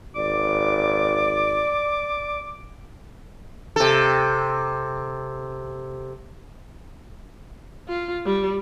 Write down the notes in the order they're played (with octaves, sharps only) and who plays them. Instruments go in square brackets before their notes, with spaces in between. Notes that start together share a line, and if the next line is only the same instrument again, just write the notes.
[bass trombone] G#1 [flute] D5 [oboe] D6
[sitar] C3 A4
[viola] F4
G3